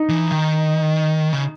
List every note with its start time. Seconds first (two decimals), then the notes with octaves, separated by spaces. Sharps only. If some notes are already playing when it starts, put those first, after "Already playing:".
Already playing: D#4
0.09 E3
0.32 D#3
1.33 C#3